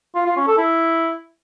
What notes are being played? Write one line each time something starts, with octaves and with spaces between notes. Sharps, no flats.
F4
F4
C#4
A4
E4